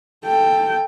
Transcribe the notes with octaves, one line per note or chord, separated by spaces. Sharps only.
A4 G5